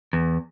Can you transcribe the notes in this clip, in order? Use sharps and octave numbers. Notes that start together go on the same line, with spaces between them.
E2